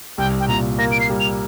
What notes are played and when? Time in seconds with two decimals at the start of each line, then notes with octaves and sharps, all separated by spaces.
0.18 C2 G5
0.40 G5
0.48 A#2 A#5
0.79 A#3 A#6
0.92 D7
1.00 C7
1.10 G3
1.20 F7